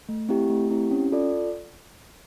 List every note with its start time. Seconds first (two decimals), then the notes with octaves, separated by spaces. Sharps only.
0.09 A3
0.29 C4 E4 G4
0.50 A3
0.71 C4 E4 G4
0.91 C#4
1.12 F4 A4 D5